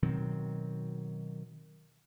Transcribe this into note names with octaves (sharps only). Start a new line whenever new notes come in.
B2 D#3 F#3 C4